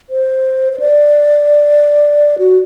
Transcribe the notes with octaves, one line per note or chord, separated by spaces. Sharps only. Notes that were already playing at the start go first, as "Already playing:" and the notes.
C5
C5
D5
F#4